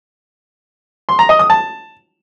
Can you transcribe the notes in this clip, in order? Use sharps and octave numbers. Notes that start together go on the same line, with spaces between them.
C6
A#5
D#5
D#6
A5